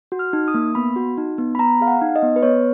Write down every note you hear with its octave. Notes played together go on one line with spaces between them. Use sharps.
F#4
F6
D#4
D#6
A#3
B3 B5
F#4
D#4
B3
B5
B3 A#5
G#4 F5
F#5
D#4
D#5
B3
B4
B3 C#5